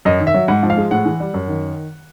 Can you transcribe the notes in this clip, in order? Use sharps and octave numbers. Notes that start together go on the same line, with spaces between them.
F#2 D#5
D#3
E5
F#3
G#2 F#5
F3
F5
G#3
A2 F#5
E3
G3
F#2
D#3